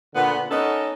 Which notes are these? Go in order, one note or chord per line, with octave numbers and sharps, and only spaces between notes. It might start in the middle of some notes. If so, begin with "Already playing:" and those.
A#2 D3 B3
B3 C#4 D#4 A4 A#4